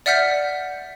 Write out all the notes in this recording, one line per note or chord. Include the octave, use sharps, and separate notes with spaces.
D5 E5 F#5 F6 G6 B6